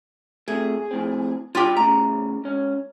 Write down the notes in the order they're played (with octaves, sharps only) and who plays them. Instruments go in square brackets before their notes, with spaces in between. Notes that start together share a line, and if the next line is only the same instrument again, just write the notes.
[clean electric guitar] C3 A3 [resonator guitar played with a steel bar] G#4
[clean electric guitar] F2 A2 C4
[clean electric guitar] G2 D#4 G5 [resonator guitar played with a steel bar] F4 G4
[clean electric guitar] A2 C#3 [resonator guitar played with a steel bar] A#5
[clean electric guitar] G#2 C#4